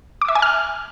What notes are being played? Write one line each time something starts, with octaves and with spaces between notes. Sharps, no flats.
D6
E5
G#5
F6